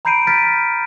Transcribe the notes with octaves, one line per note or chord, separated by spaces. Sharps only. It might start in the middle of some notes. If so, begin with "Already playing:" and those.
A#5 B5 G6 C7 D7 D#7
F6 G6 A6 B6 D7 D#7